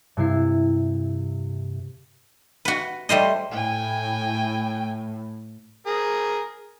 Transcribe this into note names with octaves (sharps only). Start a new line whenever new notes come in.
G2 C3 E4 C7
F#4 B4
G3 A3 C5 D#5
A2 G5 G#5
G#4 A#4